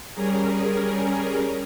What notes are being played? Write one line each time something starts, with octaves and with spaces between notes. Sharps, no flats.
G3 C#4 G#4 A#4